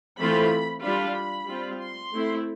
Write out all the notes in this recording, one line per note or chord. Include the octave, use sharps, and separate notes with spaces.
E3 A3 C4 F4 B5
G3 D4 F4 B5
B5
G3 C4 F4
C6
A3 C4 E4